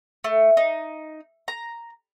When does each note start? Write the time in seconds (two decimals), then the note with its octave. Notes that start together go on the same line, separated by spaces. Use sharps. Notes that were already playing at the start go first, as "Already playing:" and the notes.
0.24 A3
0.57 D#4
1.48 A#5